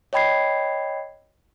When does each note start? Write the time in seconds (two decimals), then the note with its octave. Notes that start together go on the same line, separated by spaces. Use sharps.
0.13 C#5 D#5 G5 B5 G#6 C7